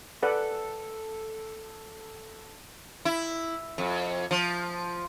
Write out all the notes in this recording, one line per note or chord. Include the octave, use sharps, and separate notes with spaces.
A4 B4 D5 F#5
E4
F2
F3